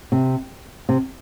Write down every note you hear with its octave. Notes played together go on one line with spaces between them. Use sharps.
C3
C3